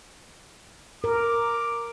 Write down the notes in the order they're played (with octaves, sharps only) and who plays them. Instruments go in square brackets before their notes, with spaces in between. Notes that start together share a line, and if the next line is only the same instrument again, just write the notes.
[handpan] A#4 [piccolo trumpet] D6